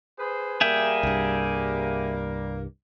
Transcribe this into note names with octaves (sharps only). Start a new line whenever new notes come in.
G#4 B4 C5
G3 A#3 G#4 E5 G5
C2 G2